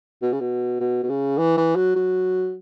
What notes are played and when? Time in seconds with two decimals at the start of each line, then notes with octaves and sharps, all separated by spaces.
0.22 B2
0.32 C#3
0.40 B2
0.80 B2
1.03 B2
1.09 C#3
1.38 E3
1.57 E3
1.76 F#3
1.95 F#3